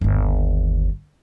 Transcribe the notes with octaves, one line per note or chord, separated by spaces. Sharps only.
G1 D#2